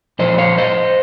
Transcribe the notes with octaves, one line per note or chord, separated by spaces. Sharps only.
A#2 F3 C5 D#5
C#5 F5
C5 D#5